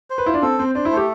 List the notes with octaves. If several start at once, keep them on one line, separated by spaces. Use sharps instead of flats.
C5
B4
E4 F4
D4
C4 A4
C4 C5
D4 C5
E4
A3
G4